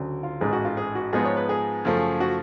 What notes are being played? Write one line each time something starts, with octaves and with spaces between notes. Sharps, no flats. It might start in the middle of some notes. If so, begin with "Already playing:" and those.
Already playing: D2 C#3 F#3
F4
A1 G#2 G#3 G#4
F#4
F4
G#4
F#4
G#2 F3 G#3 B3 G#4
C#5
B4
G#4
F#2 C#3 F3 A3
F#4